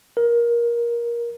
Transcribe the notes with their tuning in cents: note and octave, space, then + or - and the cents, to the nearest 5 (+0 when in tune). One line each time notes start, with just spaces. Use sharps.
A#4 +20